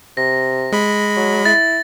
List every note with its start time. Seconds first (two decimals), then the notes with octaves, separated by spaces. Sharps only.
0.17 C3 A#6
0.72 G#3 B5
1.17 F#3
1.45 E4 A6